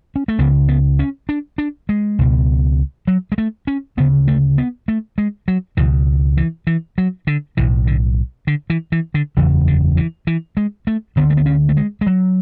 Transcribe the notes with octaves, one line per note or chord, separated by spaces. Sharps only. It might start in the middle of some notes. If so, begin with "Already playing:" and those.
C#4
A3
C#2 C#3 B3
B3
C#4
D4
D4
G#3
C#2 B2
F#3
G#3
A3
C#4
D2 C#3 B3
A3
B3
A3
G#3
F#3
C#2 B2 E3
E3
E3
F#3
D3
B1 A2 E3
D3
D3
E3
E3
D3
F#1 E2 C#3 E3
D3
E3
E3
G#3
A3
D2 D3 B3
A3
B3
C#4
A3
G#3
G#3
F#3